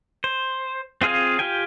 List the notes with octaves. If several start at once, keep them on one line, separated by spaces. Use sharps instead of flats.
C5
C4 F4 G#4 F5 G#5
F4 G4 G5 G#5